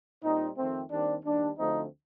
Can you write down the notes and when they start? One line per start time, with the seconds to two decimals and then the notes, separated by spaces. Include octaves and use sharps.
0.24 A#2 G3 C4 D#4
0.58 F2 D#3 A3 C4
0.91 D#2 D#3 G3 C4 D4
1.25 D#2 D#3 G3 D4
1.59 D2 D3 F3 A3 C4 D#4